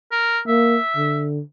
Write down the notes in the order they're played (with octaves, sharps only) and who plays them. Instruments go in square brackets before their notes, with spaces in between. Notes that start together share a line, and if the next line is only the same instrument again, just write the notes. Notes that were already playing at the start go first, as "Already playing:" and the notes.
[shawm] A#4
[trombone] A#3 [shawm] E5
[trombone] D3